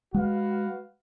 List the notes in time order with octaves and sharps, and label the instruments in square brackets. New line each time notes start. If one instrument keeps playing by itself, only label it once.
[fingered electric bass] G#3 [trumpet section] F#4 B4 F5